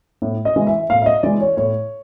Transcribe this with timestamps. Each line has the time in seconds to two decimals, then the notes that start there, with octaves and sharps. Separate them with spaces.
0.22 A2
0.45 D#5
0.56 E3 G#3
0.67 E5
0.90 A2 F5
1.02 E5
1.06 D#5
1.23 E3 G#3 D5
1.41 C#5
1.57 A2 C#5